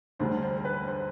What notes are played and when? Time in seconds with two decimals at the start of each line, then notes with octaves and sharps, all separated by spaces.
0.19 E1 D2 D3 G3 C5
0.42 C5
0.57 C5
0.65 B4
0.88 C5